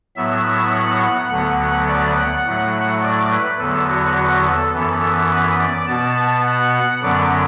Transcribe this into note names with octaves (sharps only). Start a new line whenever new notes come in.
A2 F#3 B3 E5
E5
F#5
F#5
D2 D3 F#3 B3
D5
F#5
A2 F#3 A3
D5
B4
E2 D3 F#3 B3 A4
F#4
F#4
A4
F#2 E3 B3
B4
D5
B2 B3 A5
A5
F#5
F#5
F#2 D3 F#3 B3 D5